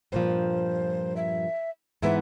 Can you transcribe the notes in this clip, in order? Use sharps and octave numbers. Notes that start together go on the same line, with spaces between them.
G2 A#2 F3 C5
E5
G#2 E3 B3 E5